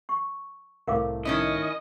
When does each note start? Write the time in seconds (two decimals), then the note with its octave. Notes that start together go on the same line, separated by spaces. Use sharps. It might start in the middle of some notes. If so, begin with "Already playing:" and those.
0.09 C#6
0.87 C2 A2 A3 A#4 F5 D6
1.25 D#3 C#4 E4 D#5